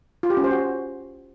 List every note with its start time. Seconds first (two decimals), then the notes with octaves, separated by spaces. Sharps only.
0.23 F4
0.30 G4
0.37 C#4
0.44 C5
0.51 F#4